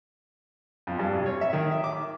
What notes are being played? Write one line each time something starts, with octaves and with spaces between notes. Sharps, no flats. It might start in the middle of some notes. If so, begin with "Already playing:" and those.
F2
G2
C3
C#5
E5
D#3
E5
D6